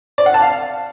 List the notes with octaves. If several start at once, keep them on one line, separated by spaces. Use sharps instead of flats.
D5
F#5
A5
F5